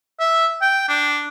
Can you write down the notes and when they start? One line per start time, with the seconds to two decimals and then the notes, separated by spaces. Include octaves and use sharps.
0.20 E5
0.62 G5
0.89 D4